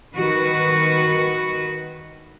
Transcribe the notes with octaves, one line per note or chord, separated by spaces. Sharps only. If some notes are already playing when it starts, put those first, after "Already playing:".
D#3 F#4 B4